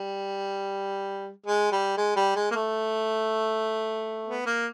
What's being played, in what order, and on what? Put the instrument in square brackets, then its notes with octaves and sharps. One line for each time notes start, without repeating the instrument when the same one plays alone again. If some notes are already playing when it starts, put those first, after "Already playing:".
Already playing: [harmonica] G3
G#3
G3
G#3
G3
G#3
A#3
A3
B3
A#3